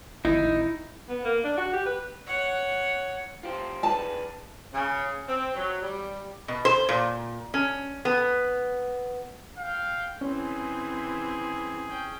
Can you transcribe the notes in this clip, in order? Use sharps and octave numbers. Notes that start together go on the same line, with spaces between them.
D1 G#1 D#4 E4
B3
A#3
D4
F#4
G4
B4
C#5 F#5
F4 G4 C5
D4 G#4 B4 A5
C#3
C4
F#3
G3
B2
C5
A#2
C#4
B3
F5 G5
E3 C4 C#4 G#4
C#4 G5